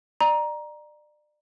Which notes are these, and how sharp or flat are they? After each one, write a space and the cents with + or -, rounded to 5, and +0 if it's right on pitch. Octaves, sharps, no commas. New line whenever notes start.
D5 +30 A#5 +15